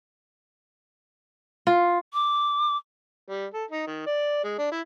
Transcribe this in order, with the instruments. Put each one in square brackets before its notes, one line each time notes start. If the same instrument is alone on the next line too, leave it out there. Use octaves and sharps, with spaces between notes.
[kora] F4
[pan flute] D6
[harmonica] G3
A4
D#4
D#3
D5
G#3
D4
E4